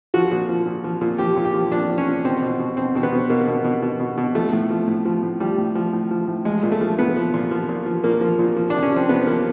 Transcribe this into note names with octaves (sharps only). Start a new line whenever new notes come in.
F3 F#4
A#2
F3
A#2
F3
A#2
F3 G4
A#2
G4
F3
A#2 D4
F3
C#4
A#2
B2 C4
B2
B2
B2 C4
B2 C4
B3
B2
B2 A#3
B2
B2
B2
B2
B2
F3 A3
A2
F3
A2
F3
A2
F3 G3
A2
F3
A2
F3
A2
F3 G#3
A#2
A3
F3
A#2 B3
F3
A#2
F3
A#2
F3
A#2 A#3
F3
A#2
F3
C3 D4
C#4
F3 C4
C3 B3
F3 A#3